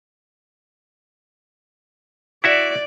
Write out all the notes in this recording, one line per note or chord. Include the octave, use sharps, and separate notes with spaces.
E4 F#4 D5 E5